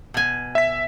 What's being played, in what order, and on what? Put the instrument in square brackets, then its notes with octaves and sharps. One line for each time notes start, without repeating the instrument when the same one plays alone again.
[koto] B2 G#5
[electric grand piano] E5 B6